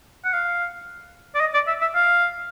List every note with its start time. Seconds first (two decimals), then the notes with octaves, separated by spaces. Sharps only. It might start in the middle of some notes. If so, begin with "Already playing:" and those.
0.24 F#5
0.33 F5
1.35 D5
1.40 D#5
1.54 D5
1.67 E5
1.81 E5
1.95 F5